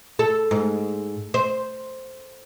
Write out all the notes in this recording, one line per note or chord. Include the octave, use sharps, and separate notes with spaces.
A4
G#2
C5